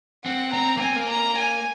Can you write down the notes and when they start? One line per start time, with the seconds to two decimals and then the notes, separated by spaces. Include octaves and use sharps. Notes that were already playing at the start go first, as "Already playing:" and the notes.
0.25 C4 F#5
0.53 C4 A#5
0.77 A#3
0.81 C4 G#5
0.96 A#3
1.10 A#5
1.38 G#5